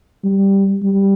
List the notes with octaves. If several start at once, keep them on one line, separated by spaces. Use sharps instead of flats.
G3
G3